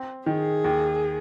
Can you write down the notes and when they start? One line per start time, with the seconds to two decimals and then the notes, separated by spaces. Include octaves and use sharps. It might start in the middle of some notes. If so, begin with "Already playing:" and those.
Already playing: C4
0.26 D#3 G#4
0.64 D#2